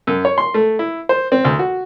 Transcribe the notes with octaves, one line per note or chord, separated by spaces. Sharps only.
F#2
C#5
C6
A3
E4
C5
C4
D2
F#4